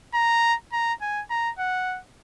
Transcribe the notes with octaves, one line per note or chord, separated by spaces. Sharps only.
A#5
A#5
G#5
A#5
F#5